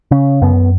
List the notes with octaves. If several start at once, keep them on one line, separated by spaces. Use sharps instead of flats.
C#3 C#4
F#2 B3